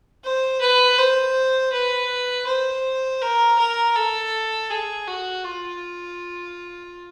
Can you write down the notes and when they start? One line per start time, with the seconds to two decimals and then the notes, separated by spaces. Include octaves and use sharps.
0.24 C5
0.61 B4
0.98 C5
1.72 B4
2.47 C5
3.22 A#4
3.58 A#4
3.96 A4
4.70 G#4
5.08 F#4
5.45 F4